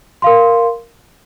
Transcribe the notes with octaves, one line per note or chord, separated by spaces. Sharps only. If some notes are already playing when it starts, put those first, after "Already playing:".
A#4 F5 C6